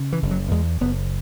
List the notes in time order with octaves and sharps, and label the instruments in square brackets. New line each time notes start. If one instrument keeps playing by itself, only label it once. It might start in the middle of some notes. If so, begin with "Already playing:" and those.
Already playing: [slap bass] C#3
E3
F#1
F#3
E2 G#3
F#1 B3